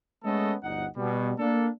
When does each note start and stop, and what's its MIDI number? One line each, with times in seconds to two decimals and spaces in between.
0.24 0.54 56
0.24 0.54 57
0.24 0.54 59
0.24 0.54 61
0.24 0.54 69
0.24 0.54 75
0.63 0.86 31
0.63 0.86 38
0.63 0.86 63
0.63 0.86 78
0.96 1.32 47
0.96 1.32 55
1.39 1.69 58
1.39 1.69 62
1.39 1.69 69